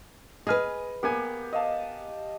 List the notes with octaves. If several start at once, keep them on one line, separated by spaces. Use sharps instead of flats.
G#4 B4 D#5 G#5 F6
A#3 B3 G4 G#5
D#5 F5 A5